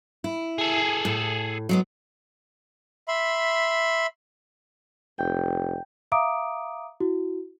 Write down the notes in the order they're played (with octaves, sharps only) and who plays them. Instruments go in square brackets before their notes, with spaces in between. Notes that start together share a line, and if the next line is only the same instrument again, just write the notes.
[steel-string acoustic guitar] E4
[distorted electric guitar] G#4 A4
[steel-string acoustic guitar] A2
F#3 G#3 B3
[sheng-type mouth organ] E5 B5 C6
[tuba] F1 [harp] G5
[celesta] E5 F5 A#5 D6 D#6 D7
E4 F#4